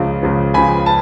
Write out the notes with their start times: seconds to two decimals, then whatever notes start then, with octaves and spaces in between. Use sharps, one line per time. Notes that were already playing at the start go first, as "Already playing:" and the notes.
Already playing: C#2 C#3 F3
0.23 C#2 C#3 F3
0.54 C#2 C#3 F3 G#5 B5
0.86 A5